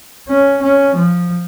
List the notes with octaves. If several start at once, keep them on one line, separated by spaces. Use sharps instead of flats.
C#4
C#4
F3